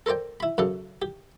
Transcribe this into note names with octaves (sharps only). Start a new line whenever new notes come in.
A4 A#4 C5 D5 G5
E4 B5
F#2 C#3 A4
G4